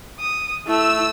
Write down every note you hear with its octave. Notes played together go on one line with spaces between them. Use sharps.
D#6
A3 E4 E6